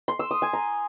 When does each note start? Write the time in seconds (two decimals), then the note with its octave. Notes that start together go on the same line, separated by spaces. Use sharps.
0.08 C6
0.19 E6
0.31 D#6
0.42 G#5
0.53 A#5